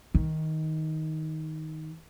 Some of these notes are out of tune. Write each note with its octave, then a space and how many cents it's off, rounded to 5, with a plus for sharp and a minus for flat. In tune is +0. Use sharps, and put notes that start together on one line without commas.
D#3 +10